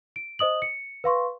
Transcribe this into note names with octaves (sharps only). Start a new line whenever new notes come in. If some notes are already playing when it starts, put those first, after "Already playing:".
D7
C5 D#5 D#6 F#7
C#7
B4 F5 C6 C#6